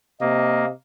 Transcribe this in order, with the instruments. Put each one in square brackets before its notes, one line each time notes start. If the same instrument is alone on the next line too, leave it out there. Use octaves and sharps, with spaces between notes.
[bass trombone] C3 [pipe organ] A#3 [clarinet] D#5